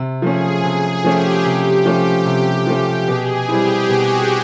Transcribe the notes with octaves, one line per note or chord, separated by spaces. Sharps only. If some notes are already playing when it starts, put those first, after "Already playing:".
Already playing: C3
F3 A3 C#4 G#4
C3 G#4
F3 A3 C#4 G4
C3
F3 A3 C#4
C3
F3 A3 C#4
B2 G#4
G3 C4 E4 G4
B2 F#4